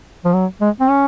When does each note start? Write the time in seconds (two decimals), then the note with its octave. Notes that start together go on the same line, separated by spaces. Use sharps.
0.25 F3
0.33 F#3
0.61 G#3
0.80 C4
0.90 C#4